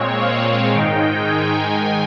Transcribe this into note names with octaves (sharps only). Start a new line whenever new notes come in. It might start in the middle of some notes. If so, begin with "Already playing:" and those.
Already playing: A#2 G#3 C4 C#5
F5
G#2 D#3 G#3 D#4 G5
G#5